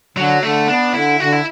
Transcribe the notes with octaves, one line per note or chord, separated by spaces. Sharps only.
D3 F#3
D3 A3
B3 D4
D3 E4
D3 F#4
E4